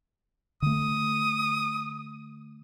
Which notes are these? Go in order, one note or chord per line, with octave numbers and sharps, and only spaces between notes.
D3 A3 D#6